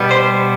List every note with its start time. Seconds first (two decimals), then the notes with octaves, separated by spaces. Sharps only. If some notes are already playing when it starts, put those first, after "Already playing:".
Already playing: B2 G3 B3
0.11 C5